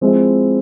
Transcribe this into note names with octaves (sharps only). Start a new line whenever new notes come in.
F3 G#3 C4 E4